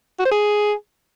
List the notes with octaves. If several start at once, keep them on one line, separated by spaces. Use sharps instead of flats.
F#4
C5
G#4